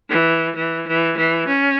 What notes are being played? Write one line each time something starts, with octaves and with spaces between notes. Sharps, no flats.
E3
E3
E3
E3
C#4